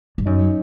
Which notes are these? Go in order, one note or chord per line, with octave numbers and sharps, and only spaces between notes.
G2
F#2 C#4 D#4